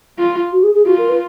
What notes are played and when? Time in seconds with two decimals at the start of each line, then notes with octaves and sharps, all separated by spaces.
0.19 F4
0.53 F#4
0.63 G#4
0.75 G#4
0.86 F4 F#4
0.98 A#4
1.09 B4